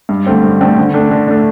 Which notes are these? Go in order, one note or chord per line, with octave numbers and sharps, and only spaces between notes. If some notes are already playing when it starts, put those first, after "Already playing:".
G2
D3 A3 C4
G2
D3 A3 C4
D3
A3 D4
D3
A3 D4